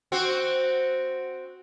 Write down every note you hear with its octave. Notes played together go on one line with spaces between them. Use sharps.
C4 F#4